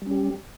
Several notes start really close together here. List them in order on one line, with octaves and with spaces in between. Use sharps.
G3 C#4 G4